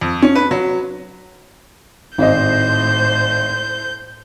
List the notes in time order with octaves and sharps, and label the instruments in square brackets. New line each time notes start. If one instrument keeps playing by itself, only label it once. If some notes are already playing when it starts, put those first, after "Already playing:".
[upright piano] F2
C#4
B4
F#3
[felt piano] G#1 D#5 [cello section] A2 C5 [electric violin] G6